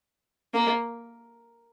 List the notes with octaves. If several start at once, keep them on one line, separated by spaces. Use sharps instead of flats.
A#3